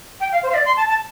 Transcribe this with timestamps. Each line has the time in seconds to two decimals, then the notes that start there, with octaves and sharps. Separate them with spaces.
0.20 G5
0.32 F5
0.43 C5
0.49 F5
0.54 D5
0.65 C6
0.77 A5
0.88 A5